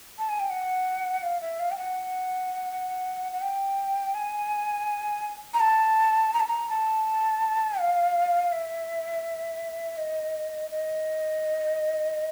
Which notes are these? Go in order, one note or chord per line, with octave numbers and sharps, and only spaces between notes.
A5
G#5
G5
F#5
F5
E5
F5
G5
F#5
F#5
G5
G#5
A#5
A5
A#5
A5
A#5
A5
F5
E5
D#5
D#5